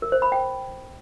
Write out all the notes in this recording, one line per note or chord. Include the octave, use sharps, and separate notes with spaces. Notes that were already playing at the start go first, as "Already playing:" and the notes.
A#4
C5
B5
G5